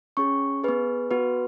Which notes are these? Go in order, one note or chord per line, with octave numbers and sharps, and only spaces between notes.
C#4 G#4 C#6
B3 G#4 B4
B3 F#4 B4